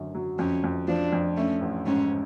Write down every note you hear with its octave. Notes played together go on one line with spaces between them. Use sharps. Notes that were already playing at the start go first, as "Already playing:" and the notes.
Already playing: G#1 F#2 D3
F#3
F2 C#4
F2
F3 D4
F2
A3 C#4
A1
G#2 C#4